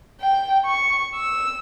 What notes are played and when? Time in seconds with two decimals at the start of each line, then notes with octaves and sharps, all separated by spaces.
0.21 G5
0.65 C#6
1.16 E6